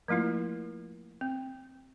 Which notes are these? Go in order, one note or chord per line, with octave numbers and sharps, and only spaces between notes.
F3 A3 A#3 E4 F4
C4